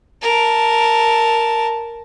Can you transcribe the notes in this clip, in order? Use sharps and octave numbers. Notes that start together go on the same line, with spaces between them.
A#4 A5